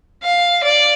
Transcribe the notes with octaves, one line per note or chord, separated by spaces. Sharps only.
F5
D5